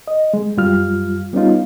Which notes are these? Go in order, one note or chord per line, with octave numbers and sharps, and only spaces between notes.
D#5
G#3
F#2 G3 F4 F6
G3 B3 C#4 D#4 F4